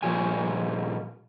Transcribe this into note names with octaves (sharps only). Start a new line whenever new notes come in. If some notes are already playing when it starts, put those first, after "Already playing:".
A#2 F3 G3 G#5